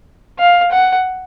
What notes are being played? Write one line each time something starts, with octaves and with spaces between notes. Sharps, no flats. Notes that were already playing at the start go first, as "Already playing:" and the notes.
F5
F#5